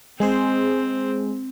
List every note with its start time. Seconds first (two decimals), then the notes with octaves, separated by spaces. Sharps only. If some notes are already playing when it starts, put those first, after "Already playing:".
0.20 G#3 C4 G#4 C5